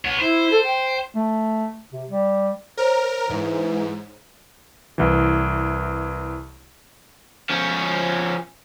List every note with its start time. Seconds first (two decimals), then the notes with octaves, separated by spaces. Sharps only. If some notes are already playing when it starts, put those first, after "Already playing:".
0.05 B3 C#5 F#5
0.19 E4 C5
0.51 A4
0.64 G5
1.15 A3
1.92 C3
2.09 G3
2.77 A#4 C5 C#5
3.30 G#2 E3
4.98 C2 E3
7.50 F3 C#4